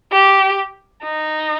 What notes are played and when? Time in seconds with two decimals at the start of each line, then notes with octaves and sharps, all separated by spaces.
0.12 G4
1.04 D#4